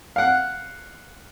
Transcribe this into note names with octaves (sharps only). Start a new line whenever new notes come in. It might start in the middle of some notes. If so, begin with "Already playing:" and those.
F5 F#5